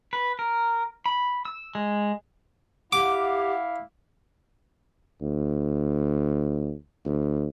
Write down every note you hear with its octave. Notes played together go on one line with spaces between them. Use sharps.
B4
A#4
B5
E6
G#3
E4 G4 F5 F#5 D6
D2
D2